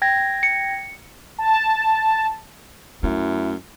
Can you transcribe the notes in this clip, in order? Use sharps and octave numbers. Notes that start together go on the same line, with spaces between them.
G5 G#6 A#6
C#7
A5
F#2 A3 E4